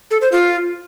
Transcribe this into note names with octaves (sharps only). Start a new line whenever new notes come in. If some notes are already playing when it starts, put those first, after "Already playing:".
A4
C5
F4